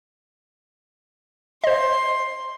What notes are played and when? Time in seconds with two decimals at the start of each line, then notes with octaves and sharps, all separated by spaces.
1.64 C5 D#5 C6